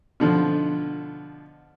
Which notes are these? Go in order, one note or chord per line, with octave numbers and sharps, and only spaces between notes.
B2 D3 F3